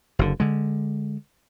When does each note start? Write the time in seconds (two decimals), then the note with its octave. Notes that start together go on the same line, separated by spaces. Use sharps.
0.19 F#1 D3
0.40 D3 G#3